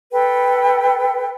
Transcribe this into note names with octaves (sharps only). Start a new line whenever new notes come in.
A4 B4 G5